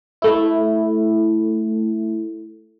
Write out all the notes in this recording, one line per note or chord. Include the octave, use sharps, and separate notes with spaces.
A3 E4